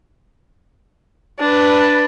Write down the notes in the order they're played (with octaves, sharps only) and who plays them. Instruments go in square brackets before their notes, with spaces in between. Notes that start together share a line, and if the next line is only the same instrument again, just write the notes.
[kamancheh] D4 B4